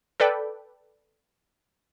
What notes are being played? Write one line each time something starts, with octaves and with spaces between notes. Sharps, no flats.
A4 B4 D5 G5